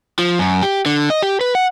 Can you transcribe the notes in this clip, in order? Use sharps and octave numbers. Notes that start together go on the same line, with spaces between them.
F3
F#2
G4
D3
D#5
G4
B4
F#5